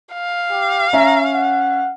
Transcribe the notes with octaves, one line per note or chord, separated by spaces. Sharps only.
F5
G4
C#4 E5 A#5
F#5